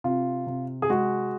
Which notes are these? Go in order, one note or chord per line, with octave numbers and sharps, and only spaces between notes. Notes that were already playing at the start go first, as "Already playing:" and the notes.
C3 F4
C3
G#4
G#3 F#4